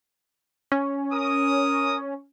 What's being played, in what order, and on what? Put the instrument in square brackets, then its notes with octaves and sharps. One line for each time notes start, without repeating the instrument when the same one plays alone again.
[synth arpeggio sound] C#4
[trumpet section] A#4 D#6